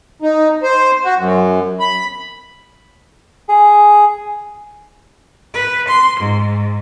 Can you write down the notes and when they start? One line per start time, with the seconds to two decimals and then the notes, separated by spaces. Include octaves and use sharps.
0.22 D#4
0.63 C5
1.05 F#4
1.17 F#2
1.80 B5
3.49 G#4
5.54 B4
5.88 C6
6.19 G#2